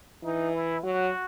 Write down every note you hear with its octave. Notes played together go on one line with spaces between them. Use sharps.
E3 D#4
E4
F#3 F#4